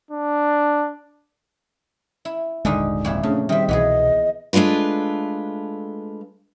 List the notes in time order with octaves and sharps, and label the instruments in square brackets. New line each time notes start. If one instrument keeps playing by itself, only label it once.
[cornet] D4
[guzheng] E4
[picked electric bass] D#1 G#1 G#3 [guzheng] D3 D#3 D#4
[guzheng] F2 A#2 E4
[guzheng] C#3 [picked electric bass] A3 [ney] D4
[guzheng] D#3 C4 [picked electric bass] G3 [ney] E5
[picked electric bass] C2 B2 [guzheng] E3 B3 G#4 [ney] D#5
[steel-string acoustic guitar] G#3 A3 D4 F4 B4